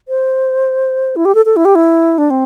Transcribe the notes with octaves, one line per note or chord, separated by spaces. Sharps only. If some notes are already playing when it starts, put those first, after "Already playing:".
C5
E4
G4
A4
A4
E4
G4
E4
D4
C4